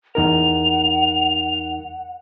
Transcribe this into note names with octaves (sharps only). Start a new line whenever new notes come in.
E2 D#4 A#4 F#5 F7